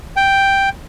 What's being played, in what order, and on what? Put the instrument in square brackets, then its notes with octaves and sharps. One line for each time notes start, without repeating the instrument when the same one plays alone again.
[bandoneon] G5